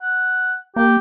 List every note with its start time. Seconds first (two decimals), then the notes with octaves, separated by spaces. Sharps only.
0.02 F#5
0.76 A#3 G4